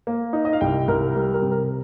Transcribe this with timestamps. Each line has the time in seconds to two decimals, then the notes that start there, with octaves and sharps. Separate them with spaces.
0.07 A#3
0.33 D#4
0.45 D#5
0.53 F5
0.61 C2 G5
0.88 C2 A#4
1.15 G3 A#4
1.34 A#4
1.42 C3
1.51 A#4